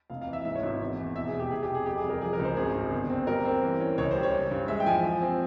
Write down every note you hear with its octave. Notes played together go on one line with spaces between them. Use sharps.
F1 F5
F5
E3
E5
G#2 E5
C#5
G#1 E5
E2
E2
E1 E5
G#4
E1
G4
F1 G#4
G4
C3
G#4
F2 G4
G#4
G3
A#4
F3 G#4
A#4
C#2
C5
G#1 G#4
G2
G1
C4
G3 A#4
C4
E3
C#4
C#2 C#5
C5
G3
C#5
C#4
G2
G#3 E5
G5
F3 G#5
F3
C4